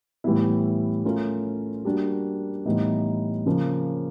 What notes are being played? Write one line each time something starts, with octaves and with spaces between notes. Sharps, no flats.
A2 E3 G3 B3 E4
A3 C#4 F4 A#4
G3 A#3 D4 F#4
A2 E3 G3 B3 D#4
C#3 F3 A#3 C#4